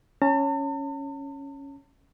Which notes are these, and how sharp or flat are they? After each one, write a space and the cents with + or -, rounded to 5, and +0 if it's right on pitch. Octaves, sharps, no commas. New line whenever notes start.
C#4 +0 A5 +45